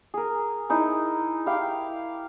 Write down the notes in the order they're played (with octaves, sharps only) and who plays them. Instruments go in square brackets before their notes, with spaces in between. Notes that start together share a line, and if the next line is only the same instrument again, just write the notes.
[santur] G#4 A#4
D#4 E4 G#4
E4 G4 F5 G5